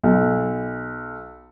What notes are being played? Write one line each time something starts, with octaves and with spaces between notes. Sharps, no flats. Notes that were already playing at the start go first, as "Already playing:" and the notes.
B1